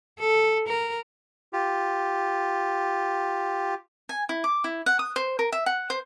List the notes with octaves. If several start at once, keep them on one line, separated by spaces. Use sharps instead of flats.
A4
A#4
F4 G4
G#5
E4
D6
E4
F#5
D#6
C5
A#4
E5
F#5
C5